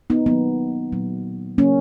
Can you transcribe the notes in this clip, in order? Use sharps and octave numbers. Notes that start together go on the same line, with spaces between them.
B3 D#4
D#3 F#3 A#3 B3
A#2 F#3 A#3
C#3 F#3 A#3 C#4